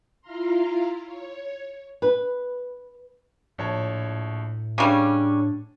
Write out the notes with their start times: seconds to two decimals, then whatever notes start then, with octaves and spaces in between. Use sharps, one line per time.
0.21 E4 F4 F5 A#5 C6
1.06 C#5
2.02 B4
3.58 A#1 A2 C#5 A5
4.78 C#3 G3 C#4 D4 D6 D#7